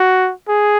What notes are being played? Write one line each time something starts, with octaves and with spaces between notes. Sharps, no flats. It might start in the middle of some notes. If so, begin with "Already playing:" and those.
Already playing: F#4
G#4